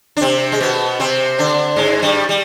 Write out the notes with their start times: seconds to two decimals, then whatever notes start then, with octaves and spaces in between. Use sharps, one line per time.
0.17 D4
0.21 C3 C4
0.52 G#3
0.61 B2 B3
1.00 C3 C4
1.38 D3 D4
1.76 G#2 G#3
2.02 G2 G3
2.29 G3